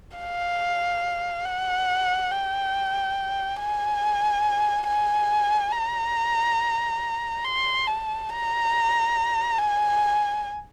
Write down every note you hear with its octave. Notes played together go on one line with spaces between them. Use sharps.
F5
F#5
G5
G#5
G#5
A#5
C6
A5
A#5
G#5